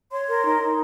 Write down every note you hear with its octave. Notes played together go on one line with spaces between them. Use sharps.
C#5 C6
A#4
D#4
D#4